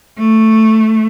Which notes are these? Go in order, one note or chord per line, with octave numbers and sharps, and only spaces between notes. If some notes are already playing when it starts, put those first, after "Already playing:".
A3